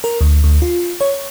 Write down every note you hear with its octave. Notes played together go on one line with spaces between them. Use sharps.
A#4
D2
D2
F4
C#5